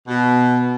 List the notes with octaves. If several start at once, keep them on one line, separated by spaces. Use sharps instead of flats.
B2